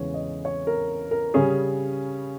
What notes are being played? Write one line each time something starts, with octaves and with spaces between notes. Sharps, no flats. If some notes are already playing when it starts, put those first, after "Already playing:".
Already playing: E2 C#3 E3 G#3 B3 C#5
D#5
C#5
A#4
A#4
C#3 G3 C#4 G#4